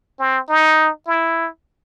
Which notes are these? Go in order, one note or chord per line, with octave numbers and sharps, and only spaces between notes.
C4
D#4
E4